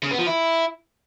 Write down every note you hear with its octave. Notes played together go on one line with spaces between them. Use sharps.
C#3
B3
F3
E4